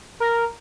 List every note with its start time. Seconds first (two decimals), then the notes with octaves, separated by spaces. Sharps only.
0.20 A#4